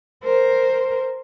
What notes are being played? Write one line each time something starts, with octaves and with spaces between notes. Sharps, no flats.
A#4 C5